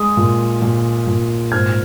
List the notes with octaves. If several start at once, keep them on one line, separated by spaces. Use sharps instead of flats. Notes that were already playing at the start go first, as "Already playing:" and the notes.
Already playing: G#3 D#6
A#2
A#2
A#2
G#2 F6 G#6